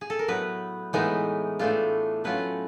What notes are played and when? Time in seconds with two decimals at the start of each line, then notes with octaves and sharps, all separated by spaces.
0.01 G#4
0.10 A4
0.19 A#4
0.28 A2 F#3 B3 B4
0.93 A2 E3 G#3 B3 D#4
1.59 A2 E3 A3 D4 F4
2.24 F#3 A3 C#4 F4 B4